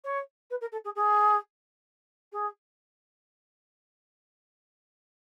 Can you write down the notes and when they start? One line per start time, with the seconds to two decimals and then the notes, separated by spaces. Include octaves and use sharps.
0.04 C#5
0.50 B4
0.61 A#4
0.72 A4
0.85 G#4
0.96 G#4
2.33 G#4